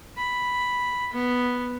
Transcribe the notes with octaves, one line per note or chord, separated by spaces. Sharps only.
B5
B3